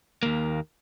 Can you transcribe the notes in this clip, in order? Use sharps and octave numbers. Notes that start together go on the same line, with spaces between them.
D#2 A#3